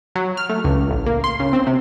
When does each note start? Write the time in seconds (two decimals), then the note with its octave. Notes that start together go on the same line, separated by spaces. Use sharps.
0.15 F#3
0.37 F6
0.49 A3
0.64 C#2
0.91 A1
1.06 A#3
1.24 C6
1.40 C#3
1.53 C4
1.67 C3